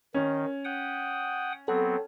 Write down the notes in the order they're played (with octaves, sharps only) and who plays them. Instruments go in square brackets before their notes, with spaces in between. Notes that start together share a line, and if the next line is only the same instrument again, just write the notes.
[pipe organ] D#3 [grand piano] C#4
[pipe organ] F#5 G5 D#6
[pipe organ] F#3 B3 C4 [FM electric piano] A4